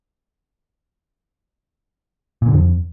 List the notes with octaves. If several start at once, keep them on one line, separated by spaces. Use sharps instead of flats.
A#2
D3
F2